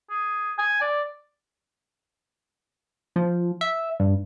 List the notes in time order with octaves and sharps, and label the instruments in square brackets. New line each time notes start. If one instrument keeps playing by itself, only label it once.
[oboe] G#4
G#5
D5
[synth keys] F3
E5
G2